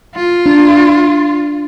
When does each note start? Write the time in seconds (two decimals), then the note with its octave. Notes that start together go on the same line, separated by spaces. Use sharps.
0.16 F4
0.46 D4